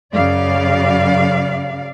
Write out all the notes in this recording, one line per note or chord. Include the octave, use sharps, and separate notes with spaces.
F#2 C#3 F#3 D5 F5